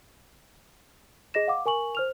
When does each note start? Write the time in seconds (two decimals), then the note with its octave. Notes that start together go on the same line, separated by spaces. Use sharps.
1.34 G#4 D#5 A#6 E7
1.48 F5 F#5 D6
1.66 A#4 G#5 C#6 F#7
1.95 C5 F6 F7